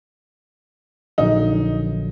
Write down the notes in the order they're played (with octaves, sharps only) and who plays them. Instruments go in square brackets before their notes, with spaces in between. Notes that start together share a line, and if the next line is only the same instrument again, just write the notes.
[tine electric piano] A#1 D3 F#3 [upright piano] D#4